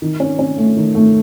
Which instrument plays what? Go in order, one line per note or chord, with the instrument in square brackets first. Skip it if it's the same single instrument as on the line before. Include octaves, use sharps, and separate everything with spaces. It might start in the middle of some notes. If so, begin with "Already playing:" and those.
[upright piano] D#3
C#4
C#4
A3
D#3
A3